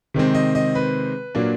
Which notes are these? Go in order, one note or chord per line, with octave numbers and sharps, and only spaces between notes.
C3 D#3 G#3 C4
D#5
D#5
B4
A#2 F#3 A#3 D4